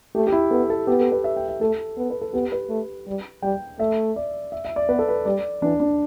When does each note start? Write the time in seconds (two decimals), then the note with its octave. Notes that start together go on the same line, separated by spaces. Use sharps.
0.15 A3 G4
0.27 G4
0.32 E4
0.51 B3 A4
0.70 A4
0.87 B3 G4
1.00 A4
1.12 B4
1.24 E5
1.37 G5
1.48 E5
1.61 A3 A4
1.97 B3
2.10 B4
2.21 A4
2.33 B3 G4
2.52 B4
2.69 A3
3.07 G3
3.42 G3 G5
3.79 A3 E5
4.16 D5
4.52 E5
4.65 E5
4.76 D5
4.89 B3 B4
4.99 A4
5.09 B4
5.25 G3 D5
5.62 E3 D4
5.80 D4